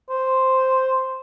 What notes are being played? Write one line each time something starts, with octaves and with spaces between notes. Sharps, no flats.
C5